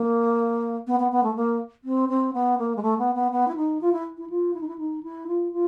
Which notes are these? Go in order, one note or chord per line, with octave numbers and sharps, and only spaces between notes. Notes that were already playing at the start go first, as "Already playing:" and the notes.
Already playing: A#3
B3
B3
B3
A3
A#3
C4
C4
B3
A#3
G#3
A3
B3
B3
B3
E4
D#4
F4
E4
E4
F4
E4
D#4
E4
D#4
E4
F4
F4